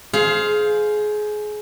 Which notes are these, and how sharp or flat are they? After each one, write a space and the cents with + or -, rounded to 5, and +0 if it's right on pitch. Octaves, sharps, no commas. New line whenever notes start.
G#4 +25 C5 +0 F5 +0